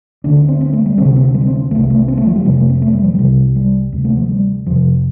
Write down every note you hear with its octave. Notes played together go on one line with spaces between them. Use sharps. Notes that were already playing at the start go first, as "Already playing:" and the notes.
D2 D3 D4
D4
C4
C4
A3
G3
D2 C3 C4
C4
G3
D4
C4
C4
C2 C3 A3
A3
C4
A3
F3
G3
F2 C3 F3
A3
C4
A3
G3
F3
C2 C3 G3
G3
D2 C3
A3
F3
G3
F2 C3 F3